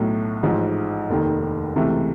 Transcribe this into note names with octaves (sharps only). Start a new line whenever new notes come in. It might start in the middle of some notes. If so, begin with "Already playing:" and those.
Already playing: B1 A2 F#3 A3
A1 G#2 F3
F1 D#2 D#3
C#2 C3 E3 A3